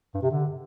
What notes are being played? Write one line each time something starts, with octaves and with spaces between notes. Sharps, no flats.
G2
C3
D3